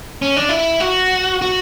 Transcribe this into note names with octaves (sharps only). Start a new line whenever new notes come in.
C#4
D4
E4
F#4
F#4